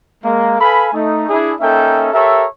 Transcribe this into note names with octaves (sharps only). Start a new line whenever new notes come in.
G#3 A#3
A4 B4 F5 G#5 B5
A3 D#4
D4 E4 G#4
A#3 C#4 D#4 A4 E5 G5
G4 A4 A#4 C#5 E5